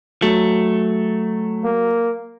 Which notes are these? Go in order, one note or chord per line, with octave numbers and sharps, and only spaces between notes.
F#3 A3
A#3